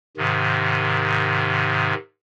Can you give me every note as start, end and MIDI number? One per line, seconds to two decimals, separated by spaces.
0.17 1.94 44
0.17 1.94 48
0.17 1.94 51